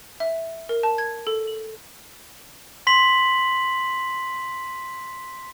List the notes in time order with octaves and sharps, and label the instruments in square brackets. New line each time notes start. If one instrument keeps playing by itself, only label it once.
[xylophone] E5
A#4
A5
G#6
A4
F#7
[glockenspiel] C6 B6 F#7